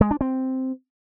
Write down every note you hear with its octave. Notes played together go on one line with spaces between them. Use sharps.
G#3
D4
C4